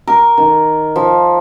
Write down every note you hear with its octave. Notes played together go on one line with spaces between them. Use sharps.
A#4
D#3
F3